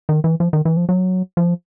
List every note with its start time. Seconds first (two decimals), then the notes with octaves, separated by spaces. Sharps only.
0.09 D#3
0.24 E3
0.40 F3
0.53 D#3
0.65 E3
0.77 F3
0.89 F#3
1.37 F3